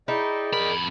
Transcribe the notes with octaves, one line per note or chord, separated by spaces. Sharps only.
D#4 E4 G#4 D5 D#5 G5
F2 A#4 B5